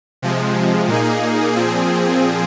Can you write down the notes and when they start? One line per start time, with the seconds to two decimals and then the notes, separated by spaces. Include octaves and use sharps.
0.22 C3 F3 G#3
0.88 A#2 A#3 D#4 G#4
1.54 A#2 F3 C4 G#4